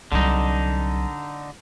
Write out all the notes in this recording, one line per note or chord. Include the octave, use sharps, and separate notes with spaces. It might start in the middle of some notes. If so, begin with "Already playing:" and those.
C2 D3 F#3 D#4